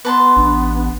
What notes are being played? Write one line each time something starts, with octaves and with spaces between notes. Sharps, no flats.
B3 B4 A5 C6
A1 D4